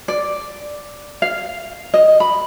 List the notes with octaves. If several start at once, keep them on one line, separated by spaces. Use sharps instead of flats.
D5
F5
D#5
B5